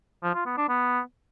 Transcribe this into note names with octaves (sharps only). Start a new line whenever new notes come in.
F3
F4
B3
D4
B3